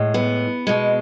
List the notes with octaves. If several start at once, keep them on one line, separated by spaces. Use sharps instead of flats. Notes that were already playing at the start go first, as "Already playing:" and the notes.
Already playing: A2 G#3
B3
B2 G#3